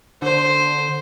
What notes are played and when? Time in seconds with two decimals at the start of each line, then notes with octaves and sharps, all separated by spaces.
0.22 D3 C5